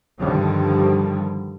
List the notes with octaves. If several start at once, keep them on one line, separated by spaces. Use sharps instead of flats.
G2 D3 D#3 F3 G3